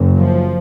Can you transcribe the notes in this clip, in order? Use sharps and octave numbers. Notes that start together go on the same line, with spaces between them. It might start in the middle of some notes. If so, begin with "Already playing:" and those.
Already playing: F#1 F#2
F3